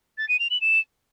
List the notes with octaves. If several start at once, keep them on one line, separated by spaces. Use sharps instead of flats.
A6
D#7
F7
F#7
E7